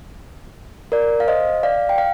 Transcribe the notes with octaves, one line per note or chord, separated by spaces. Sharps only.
A#4 D5
F5
C5 D#5
D5 F5
G5
F5